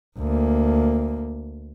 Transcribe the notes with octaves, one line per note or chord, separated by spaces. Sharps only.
D2 A#3